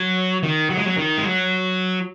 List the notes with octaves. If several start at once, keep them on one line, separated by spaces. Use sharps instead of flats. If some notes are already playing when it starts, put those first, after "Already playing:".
Already playing: F#3
D#3
F#3
G#3
F#3
D#3
G#3
F#3